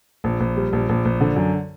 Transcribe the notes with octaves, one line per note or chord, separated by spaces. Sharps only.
A#1
A#1
G3
A#1
A#1
A#1
D3
F#2